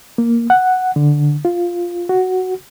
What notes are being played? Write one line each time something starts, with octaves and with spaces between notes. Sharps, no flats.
A#3
F#5
D3
F4
F#4